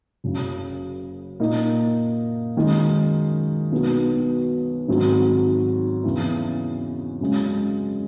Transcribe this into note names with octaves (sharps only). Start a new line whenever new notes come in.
F#1 F#2 C#3
A#2 A#3 D#4
F#2 D#3 G#3 D#4
B1 B2 F#3 B3
G#1 G#2 F#3
E2 C#3 E3
F#2 C#3 G#3